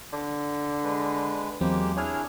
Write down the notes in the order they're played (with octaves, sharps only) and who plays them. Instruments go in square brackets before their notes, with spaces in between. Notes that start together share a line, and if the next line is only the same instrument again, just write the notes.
[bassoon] D3
[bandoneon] G#3 B4
[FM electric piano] E2 F#3 C4 [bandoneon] G#3 A#3 G4
[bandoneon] D4 E4 G#4 [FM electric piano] C#5 G#5 F6